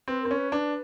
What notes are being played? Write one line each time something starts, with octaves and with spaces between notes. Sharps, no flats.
C4 B4
C4 A#4
C#4
B4
D4 B4